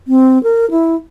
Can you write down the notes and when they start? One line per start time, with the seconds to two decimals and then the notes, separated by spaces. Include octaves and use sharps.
0.08 C4
0.43 A#4
0.71 E4